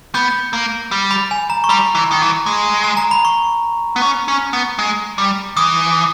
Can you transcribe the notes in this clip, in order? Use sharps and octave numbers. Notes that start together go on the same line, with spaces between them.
B3 G6
A#3
G3
B5
G#5
A#5
C#6
G3 B5
E3
D#3
E3
G#3
G#5
A#5
B5
C#6
B3
C#4
C#4
B3
G#3
G3
E3 D#6